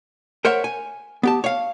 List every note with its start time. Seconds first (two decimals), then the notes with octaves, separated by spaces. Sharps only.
0.45 A#4 C5 C#5 E5 F#5
0.64 G#5
1.23 B3 G4 A5
1.44 C#5 F5